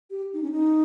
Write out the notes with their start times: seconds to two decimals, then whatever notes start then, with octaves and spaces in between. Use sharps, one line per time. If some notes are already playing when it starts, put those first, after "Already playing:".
0.11 G4
0.34 D#4
0.43 C#4
0.51 D#4